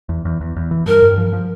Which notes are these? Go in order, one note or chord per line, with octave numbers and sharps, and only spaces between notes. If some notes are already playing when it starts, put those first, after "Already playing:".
E2
E2
E2
E2
E3
G2 A#4
G2
F3
F3